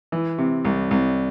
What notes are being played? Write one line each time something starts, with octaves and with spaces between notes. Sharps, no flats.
E3
C3
C2
C2